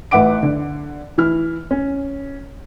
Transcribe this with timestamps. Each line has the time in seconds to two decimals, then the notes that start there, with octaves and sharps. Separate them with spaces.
0.11 A1 B4 E5 F#5 D6 D7
0.43 D3
1.18 E3 E4 F6
1.71 C#4